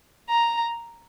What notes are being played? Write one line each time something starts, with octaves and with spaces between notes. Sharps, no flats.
A#5